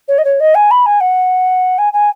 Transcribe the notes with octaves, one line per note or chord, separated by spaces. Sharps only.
C#5
D#5
C#5
D#5
G#5
B5
G#5
F#5
G#5
G#5